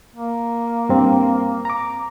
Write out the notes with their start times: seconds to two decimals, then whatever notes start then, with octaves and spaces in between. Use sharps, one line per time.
0.13 A#3
0.89 G2 C4
1.65 A#5 D6